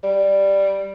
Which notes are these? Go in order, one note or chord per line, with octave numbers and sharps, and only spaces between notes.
G3